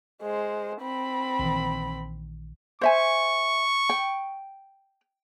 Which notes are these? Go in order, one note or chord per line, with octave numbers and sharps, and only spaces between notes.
G#3 C5
C4 B5
A#1 D#3 E3
C5 E5 G#5 C#6
G5